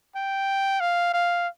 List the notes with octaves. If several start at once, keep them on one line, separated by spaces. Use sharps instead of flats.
G5
F5
F5